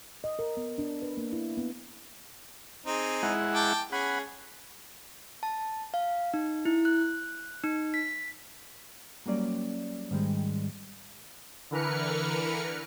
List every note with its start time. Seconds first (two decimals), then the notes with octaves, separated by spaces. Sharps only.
0.24 D#5
0.39 A#4
0.57 B3
0.78 D4
1.02 B4
1.17 A#3
1.33 E4
1.57 B3
2.86 C4 D#4 G#4
3.23 G#3 E4 F#5
3.55 G5 A5 D6
3.92 C#4 G#4 F#5 B5
5.43 A5
5.94 F5
6.34 D#4
6.65 E4
6.85 F#6
7.64 D#4
7.94 B6
9.26 F#3 G3 A#3 C#4 D5
10.11 G#2 D#3 G3 G#3
11.71 D3 E3 A#4 B4 F6 C#7